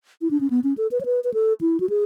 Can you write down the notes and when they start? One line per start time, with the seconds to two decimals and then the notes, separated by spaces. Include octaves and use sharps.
0.22 E4
0.31 D4
0.40 C#4
0.50 B3
0.64 C#4
0.78 A4
0.91 B4
1.01 C#5
1.05 B4
1.24 B4
1.34 A4
1.61 E4
1.80 F#4
1.90 G#4